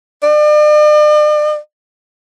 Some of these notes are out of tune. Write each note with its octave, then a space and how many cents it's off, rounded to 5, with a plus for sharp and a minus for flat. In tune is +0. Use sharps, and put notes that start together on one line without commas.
D5 +45